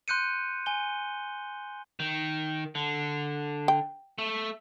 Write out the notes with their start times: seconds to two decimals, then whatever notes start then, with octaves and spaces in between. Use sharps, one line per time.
0.08 C6 F#6 G6 C#7 D#7
0.66 G#5 G7
2.00 D#3
2.75 D3
3.68 G5
4.18 A3